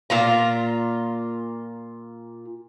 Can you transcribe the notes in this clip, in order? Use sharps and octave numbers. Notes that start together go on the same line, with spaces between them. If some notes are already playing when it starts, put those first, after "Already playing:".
A#2 F4 A#5